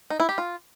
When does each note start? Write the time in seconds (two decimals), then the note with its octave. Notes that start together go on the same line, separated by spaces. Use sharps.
0.10 D#4
0.20 E4
0.29 G4
0.38 F4